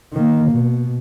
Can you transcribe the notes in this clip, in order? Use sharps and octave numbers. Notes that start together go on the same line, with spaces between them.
D#3 A#3
B2